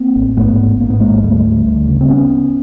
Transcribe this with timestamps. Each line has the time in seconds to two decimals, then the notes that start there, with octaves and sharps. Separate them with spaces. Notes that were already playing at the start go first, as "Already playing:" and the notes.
Already playing: A#3 C4
0.16 A1
0.37 G#2 A3 B3
0.59 A1
0.80 G#2 A#3
0.90 B3
1.00 G#2 G#3 A#3
1.23 D2 G3 A3
1.45 D2
1.66 D2
1.87 C#3
2.01 C4
2.09 B3 C#4